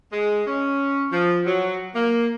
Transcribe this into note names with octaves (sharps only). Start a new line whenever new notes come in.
G#3
C#4
F3
F#3
A#3